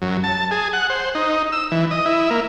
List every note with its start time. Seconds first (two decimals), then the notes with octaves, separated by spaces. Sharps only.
0.02 F#2
0.24 A5
0.51 G#4
0.73 F#5
0.90 C5
1.15 D#4
1.52 E6
1.72 E3
1.91 D#5
2.06 E4
2.31 A#3